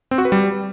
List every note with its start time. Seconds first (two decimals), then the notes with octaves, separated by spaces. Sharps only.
0.11 C4
0.18 F#4
0.25 B4
0.32 G3